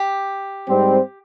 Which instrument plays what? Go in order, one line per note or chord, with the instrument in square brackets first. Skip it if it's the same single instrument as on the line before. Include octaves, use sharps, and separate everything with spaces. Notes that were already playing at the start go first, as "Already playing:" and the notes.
Already playing: [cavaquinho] G4
[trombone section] G#2 G3 C4